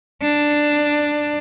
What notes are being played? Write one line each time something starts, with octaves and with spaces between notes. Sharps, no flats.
D4